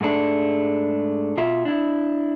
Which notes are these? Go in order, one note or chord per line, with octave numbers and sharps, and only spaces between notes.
G#2 G#3 A3 D4
B2 F4 E5
D4 E4